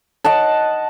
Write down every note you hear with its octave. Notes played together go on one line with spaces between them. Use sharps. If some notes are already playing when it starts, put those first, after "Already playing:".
D#5 F#5 A5